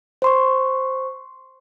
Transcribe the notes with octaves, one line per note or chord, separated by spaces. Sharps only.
C5 C6 C#6